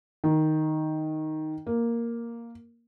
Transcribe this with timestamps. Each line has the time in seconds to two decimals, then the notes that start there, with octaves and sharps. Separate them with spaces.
0.24 D#3
1.67 A#3